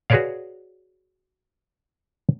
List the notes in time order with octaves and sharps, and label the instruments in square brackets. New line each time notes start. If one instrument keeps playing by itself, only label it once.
[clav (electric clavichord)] F#4 G#4 B4 C#5 D5 F5